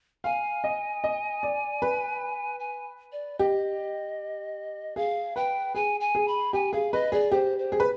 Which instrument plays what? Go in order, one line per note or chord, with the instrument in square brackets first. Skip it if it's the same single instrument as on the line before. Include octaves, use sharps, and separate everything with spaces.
[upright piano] F5 [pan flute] G#5
[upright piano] D#5
D#5
D5
B4
[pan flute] G#5
D5
[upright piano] G4 [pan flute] D#5
[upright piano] G#4 [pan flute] F5
[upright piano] B4 [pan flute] G5
[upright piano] G#4 [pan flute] G#5
[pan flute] G#5
[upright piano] G#4
[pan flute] B5
[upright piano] G4 [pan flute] G#5
[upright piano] G#4 [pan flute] F5
[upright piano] B4 [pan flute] D#5
[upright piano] G#4 [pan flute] D5
[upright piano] G4 [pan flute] C5
[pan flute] C5
[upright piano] G#4
B4